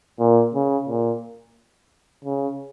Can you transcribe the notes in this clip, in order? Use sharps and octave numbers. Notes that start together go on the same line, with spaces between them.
A#2
C#3
A#2
C#3